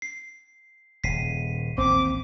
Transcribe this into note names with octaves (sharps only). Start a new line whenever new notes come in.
C7
D#1 C#3 B6 C7 D#7
A1 D#2 C4 D6